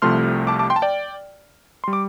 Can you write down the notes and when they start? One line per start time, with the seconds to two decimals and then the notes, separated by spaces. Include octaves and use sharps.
0.02 C2 C3 F3 A3 C6 F6
0.47 A5 D6
0.59 A5 D6
0.70 G5 C6
0.76 A5
0.82 D5 G5
1.84 C6
1.88 G3
1.93 D6